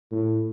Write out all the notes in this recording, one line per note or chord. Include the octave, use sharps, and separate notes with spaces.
A2